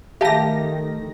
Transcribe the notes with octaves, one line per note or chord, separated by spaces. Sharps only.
D#3 A3 G4 E5 F5 A5 A#6